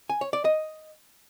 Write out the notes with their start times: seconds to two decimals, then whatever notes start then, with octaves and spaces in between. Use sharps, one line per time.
0.10 G#5
0.21 C#5
0.33 D5
0.45 D#5